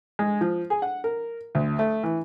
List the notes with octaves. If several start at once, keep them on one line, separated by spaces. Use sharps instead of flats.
G#3
F3
G#4
F#5
A#4
D2
A3
E3